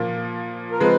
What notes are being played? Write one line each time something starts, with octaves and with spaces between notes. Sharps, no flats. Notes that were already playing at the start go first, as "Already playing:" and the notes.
Already playing: A#2 F3 A#3
A#4
F3 G#3 C4 B4